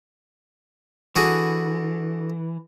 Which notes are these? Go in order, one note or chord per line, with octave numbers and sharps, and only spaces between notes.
D3 E3 F#4 G#4